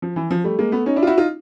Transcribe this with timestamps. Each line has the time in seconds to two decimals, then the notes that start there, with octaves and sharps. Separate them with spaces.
0.02 F3
0.16 E3
0.31 F3
0.44 G3 A3
0.59 G#3 A#3
0.72 A3 B3
0.86 C#4 D#4
0.96 D4 E4
1.02 F4
1.07 E4 F#4
1.18 D#4 F4